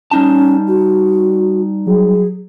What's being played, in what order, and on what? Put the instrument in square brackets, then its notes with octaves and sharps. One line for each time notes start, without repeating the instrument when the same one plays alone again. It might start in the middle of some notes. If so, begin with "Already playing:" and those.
[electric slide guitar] G3 D#4 A5 [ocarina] C#4
[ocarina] F#4
[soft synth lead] F#3 [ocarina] G#4